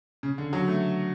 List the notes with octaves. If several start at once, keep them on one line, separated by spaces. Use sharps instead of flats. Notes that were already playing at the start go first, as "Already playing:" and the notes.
C#3
D3
F#3
A3